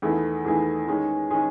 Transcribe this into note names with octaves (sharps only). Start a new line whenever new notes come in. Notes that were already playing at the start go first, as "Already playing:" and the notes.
E2 D#3 A3 E4 G#4
E2 D#3 A3 E4 G#4
D#3 G#3 C#4 G#4
D#3 G#3 C#4 G#4